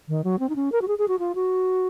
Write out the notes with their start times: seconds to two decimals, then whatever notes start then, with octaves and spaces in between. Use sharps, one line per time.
0.08 D#3
0.24 F#3
0.39 C4
0.49 D#4
0.56 C#4
0.72 A#4
0.82 F#4
0.88 G#4
0.98 G#4
1.08 F#4
1.19 F4
1.35 F#4